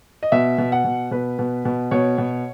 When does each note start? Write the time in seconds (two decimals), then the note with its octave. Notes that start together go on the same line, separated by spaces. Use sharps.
0.23 D#5
0.32 B2 E5
0.58 B2
0.72 F#5
0.84 B2
1.11 B2 B4
1.39 B2
1.65 B2
1.91 B2 C#5
2.18 B2